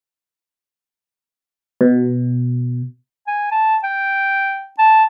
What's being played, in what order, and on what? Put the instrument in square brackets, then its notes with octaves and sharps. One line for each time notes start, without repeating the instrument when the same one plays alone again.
[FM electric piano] B2
[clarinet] G#5
A5
G5
A5